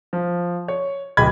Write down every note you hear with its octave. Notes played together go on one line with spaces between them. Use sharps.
F3
C#5
D1 G4 G#4 D#5 B5 G#6